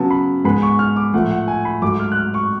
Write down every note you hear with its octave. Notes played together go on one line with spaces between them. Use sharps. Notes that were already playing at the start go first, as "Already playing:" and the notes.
Already playing: C#3 F#3 B3 A5
B5
G#2 G#3 B3 B5
C#6
F6
D6
A2 F3 A3 F#5
F#5
G#5
B5
G#2 F#3 A3 D6
F6
F#6
F6
C#6